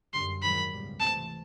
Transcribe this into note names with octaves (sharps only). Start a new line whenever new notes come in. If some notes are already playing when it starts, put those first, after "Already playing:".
F#2 D3 G3 C6
G#2 D#3 F#3 B5
C#2 B2 G3
C3 E3 A3 C4 A5